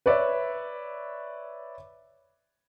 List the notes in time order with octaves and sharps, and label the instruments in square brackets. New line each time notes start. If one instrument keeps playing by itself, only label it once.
[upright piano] B4 C#5 D5 E5